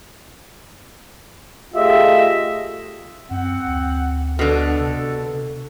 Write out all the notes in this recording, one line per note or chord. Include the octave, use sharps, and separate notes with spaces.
A3 F4 G4 G#4 D#5 E5
F#2 C4 F#5
D2
B2 D3 A4
C3